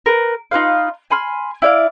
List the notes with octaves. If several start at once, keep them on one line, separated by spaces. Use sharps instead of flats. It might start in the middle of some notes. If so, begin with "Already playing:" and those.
A#4 B4
D#4 F4 B4 F5
G#5 B5 C6 F6
E4 D5 F5